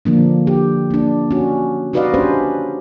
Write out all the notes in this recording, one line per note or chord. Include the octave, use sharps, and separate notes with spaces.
D3 F3 A#3 D4
G4
A#3 D4
C#4 F#4
D#4 F#4 B4 D5 D#5 F5
C#4 D4 G4 B4 C5